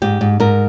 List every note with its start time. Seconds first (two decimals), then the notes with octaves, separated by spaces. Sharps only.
0.02 G#2 G4
0.21 G#2
0.40 G#2 A#4